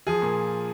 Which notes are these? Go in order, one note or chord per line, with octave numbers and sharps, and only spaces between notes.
F3 G#4
A#2